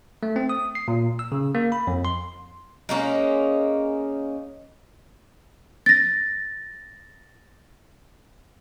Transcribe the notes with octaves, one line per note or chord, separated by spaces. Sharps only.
A3
C4
D#6
C7
A#2
E6
C#3
A#3
B5
F2
C6
G#3 A#3 C#4 D#4
A6 A#6